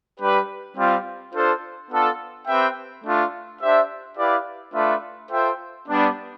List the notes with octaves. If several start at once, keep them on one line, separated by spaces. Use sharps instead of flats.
G3 D4 G4 B4
G3 C4 F4
D4 F4 A4 C5
B3 D4 F4 A4
C4 G4 B4 E5 G5
A3 D4 F4
D4 G4 C5 E5
E4 G4 B4 D5 F5
A3 D4 F4 B4 E5
F4 A4 C5 E5 G5
G3 B3 D4